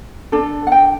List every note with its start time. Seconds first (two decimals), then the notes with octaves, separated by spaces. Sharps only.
0.32 D4 A4
0.67 F#5
0.72 G5